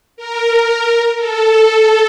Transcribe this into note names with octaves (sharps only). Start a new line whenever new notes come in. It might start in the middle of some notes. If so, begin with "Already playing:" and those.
A#4
A4